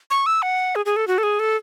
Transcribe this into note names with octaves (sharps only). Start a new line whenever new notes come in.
C#6
E6
F#5
G#4
G#4
A4
F#4
A4
G#4
A4